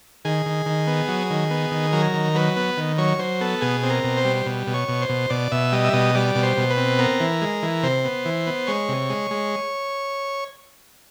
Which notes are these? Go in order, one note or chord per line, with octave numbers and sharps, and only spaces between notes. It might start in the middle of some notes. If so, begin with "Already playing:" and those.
D#3 G#4
D#3
D#3
B3
F#3
D#3
B3
D#3
F#3 A#4
D#3
F#3 B4
B3
D#3
F#3 C#5
F#3 C5
B3 A4
B2 G#4
C4
A#4
B2
C5
G3
B2
B2
C#5
B2
C5
B2
B2 D5
B2 E5
G3 D#5
E5
B2 D#5
G3 D5
B2
C5
B2
B4
C4
B3 A#4
E3
G#3
E3
C3 C5
B3
E3
B3
G#3 C#5
C3
G#3
G#3